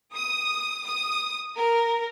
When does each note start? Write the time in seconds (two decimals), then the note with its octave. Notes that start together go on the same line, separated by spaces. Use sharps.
0.14 D#6
0.85 D#6
1.56 A#4